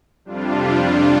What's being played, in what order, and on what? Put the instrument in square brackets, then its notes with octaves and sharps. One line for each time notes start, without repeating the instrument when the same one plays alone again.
[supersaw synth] F2 C3 G3 D4 F4